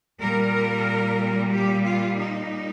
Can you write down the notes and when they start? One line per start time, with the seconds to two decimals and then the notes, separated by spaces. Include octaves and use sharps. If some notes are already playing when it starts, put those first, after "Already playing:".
0.20 A#2 G3 A#4
1.51 G4
1.84 F4
2.16 D#4